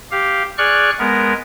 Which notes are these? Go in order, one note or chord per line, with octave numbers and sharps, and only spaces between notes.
G4 F5
G#4 D5 C#6 F6 F#6
G#3 B3 A#4